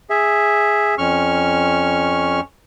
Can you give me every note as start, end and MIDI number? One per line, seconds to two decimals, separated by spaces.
0.10 0.95 68
0.10 0.95 76
0.98 2.40 41
0.98 2.40 61
0.98 2.40 85
0.98 2.40 89